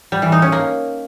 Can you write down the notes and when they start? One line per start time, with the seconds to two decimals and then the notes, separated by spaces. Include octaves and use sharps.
0.12 G3
0.22 E3
0.32 D#4
0.42 C#4
0.52 A#3